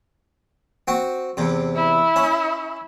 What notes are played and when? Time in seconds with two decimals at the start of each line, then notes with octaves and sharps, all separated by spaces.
0.88 C4 F#4
1.37 E2 C3
1.76 E4
2.16 C#4